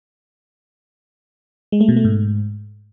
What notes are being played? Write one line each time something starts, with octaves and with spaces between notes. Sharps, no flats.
G#3
A3
B2
A3
G#2